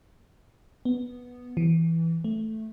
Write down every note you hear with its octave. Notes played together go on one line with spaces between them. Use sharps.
B3
E3
A3